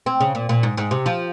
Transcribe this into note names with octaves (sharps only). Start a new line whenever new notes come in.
C4
C#3
A#2
A#2
G#2
G#2
C3
F3